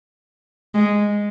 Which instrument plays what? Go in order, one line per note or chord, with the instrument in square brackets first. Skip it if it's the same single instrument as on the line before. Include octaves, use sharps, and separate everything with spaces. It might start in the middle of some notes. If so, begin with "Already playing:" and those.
[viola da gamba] G#3